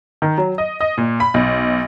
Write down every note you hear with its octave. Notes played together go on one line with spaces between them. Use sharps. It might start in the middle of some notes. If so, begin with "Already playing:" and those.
D#3
F#3
D#5
D#5
A#2
B5
B1